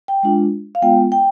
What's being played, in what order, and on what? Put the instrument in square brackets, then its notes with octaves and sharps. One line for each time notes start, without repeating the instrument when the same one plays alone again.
[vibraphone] G5
G#3 D4 F4
F5
G#3 B3 F4 G5
G5